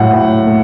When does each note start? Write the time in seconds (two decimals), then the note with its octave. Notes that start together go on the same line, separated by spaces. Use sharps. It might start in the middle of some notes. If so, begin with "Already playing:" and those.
Already playing: A2 F#3 F#5
0.14 A2
0.47 A3